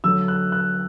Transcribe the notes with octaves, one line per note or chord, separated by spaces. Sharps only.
D3 F#3 A3 E6
F#6
F#6